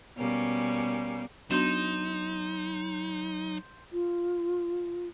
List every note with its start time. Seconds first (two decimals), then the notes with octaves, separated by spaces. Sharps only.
0.17 B2 G3 A#3 C#4
1.51 F#3 B3 D4 D#4 F#4 C6 G6 E7
3.90 F4